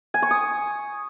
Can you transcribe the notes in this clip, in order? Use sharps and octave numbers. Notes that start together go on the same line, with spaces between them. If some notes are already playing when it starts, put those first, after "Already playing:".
G#5
C#6
D#6